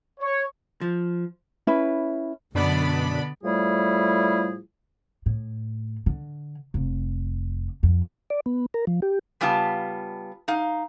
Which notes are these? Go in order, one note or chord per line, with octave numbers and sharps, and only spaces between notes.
C#5
F3
C#4 E4 B4
F#2 B2 D3 B3 D4 D5 B5
A2 F3 G3 A3 E4 G#4
A2
D3
F1
F2
D5
B3
A#4
F3
G4
C#3 G3 B3 F4 A5
D#4 F5